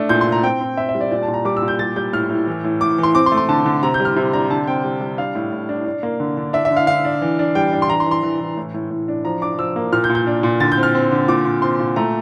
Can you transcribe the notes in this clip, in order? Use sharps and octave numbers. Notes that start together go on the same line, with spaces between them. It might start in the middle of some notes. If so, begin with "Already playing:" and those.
Already playing: A3 D4
A#2 G6
C6
A#2
A#5
C4 G5
C4
C4 E5
E5
G3
D5
A#2 D5
A5
A#2
A#5
G3 D6
E6
A#2
G6
G3 A6
G3 G6
A2 F6
A2
E3
A2
A2 D6
E3
C6
C4 D6
C6
A3
C6
D3 A5
D3
C3 A#5
G6
G3
F6
C3
D4 A#5
D3 A5
C4 G5
G3
G3
D4 F5
A2
A2
D4
D4
A#3
D3
D3
D4 E5
E5
D3
F5
D3 F5
D4
E3
D4
G3 G5
D4
C6
E3 A#5
C6
E3
C6
E3
E3
A2
A2
A2
D4
F3 A#5
D4 D6
F3 E6
A#3
A#2 F6
G6
A#2
G6
D4
A#2
D3 A6
G6
C4
F6
C4
D3
A#2 D6
A#2
C4 C6
A#2
A3 A#5